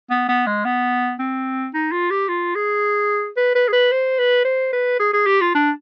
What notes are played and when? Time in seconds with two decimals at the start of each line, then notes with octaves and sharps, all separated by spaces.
0.10 B3
0.29 B3
0.46 G#3
0.65 B3
1.19 C4
1.74 D#4
1.92 F4
2.10 G4
2.28 F4
2.55 G#4
3.37 B4
3.55 B4
3.68 G#4
3.72 B4
3.92 C5
4.18 B4
4.45 C5
4.73 B4
4.99 G#4
5.13 G#4
5.26 G4
5.41 F4
5.55 D4